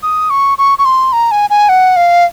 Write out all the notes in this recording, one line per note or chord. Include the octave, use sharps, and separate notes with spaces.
D#6
C#6
C#6
C#6
C6
A#5
G#5
G#5
F#5
F5